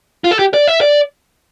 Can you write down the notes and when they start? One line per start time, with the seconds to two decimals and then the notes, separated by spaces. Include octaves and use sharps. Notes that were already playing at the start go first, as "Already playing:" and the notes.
0.24 F4
0.31 A4
0.39 G4
0.54 D5
0.68 E5
0.81 D5